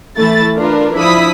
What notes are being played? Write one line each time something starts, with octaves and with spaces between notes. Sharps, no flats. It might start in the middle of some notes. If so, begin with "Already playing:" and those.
E3 A3 E4 A6
D4 F4 A#4 B4
F3 D4 E4 B5 D#6 B6